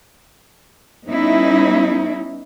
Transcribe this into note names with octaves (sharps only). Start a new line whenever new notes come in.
G3 B3 C#4 D#4 E4